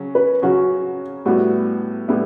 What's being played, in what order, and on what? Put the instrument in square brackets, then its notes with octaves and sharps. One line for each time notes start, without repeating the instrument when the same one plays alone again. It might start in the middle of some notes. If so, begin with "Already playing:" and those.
Already playing: [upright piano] C#3 F#3 C#4
[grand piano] B4
[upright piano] C#3 F#3 C#4 [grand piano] F#4
[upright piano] A2 G3 B3 E4 [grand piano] F#4
[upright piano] A2 G3 B3 E4